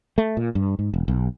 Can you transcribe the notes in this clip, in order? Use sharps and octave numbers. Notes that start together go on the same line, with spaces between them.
A3
A#2
G2
G#2
E1
B1